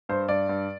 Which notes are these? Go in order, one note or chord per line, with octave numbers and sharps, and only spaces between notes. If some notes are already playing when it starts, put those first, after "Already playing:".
G2 C5
G2 D5
G2